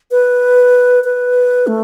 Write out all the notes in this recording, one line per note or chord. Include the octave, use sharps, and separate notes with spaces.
B4
B4
A3